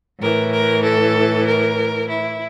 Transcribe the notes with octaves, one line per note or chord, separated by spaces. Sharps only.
A2 E3 A#4
A#4
A4
A#4
E4